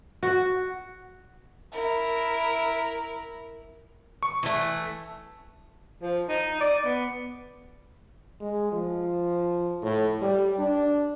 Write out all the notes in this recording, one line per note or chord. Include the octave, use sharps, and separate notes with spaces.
F#4
E4 A#4
C#6
E3 A3
F3
D#4
D5
B3
G#3
F3
A2
G3
D4